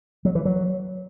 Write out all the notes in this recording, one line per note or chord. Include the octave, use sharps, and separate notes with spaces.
F#3
E3
F#3